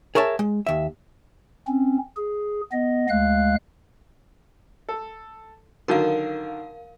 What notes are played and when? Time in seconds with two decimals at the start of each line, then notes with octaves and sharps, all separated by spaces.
0.15 G#4 A#4 C#5 E5 A5
0.39 G#3
0.67 D#2 E5
1.68 C4 C#4
2.16 G#4
2.72 B3 D#5
3.09 D2 G#3 F5 F#6
4.89 A4
5.88 D3 D#3 F#3 A#4 F5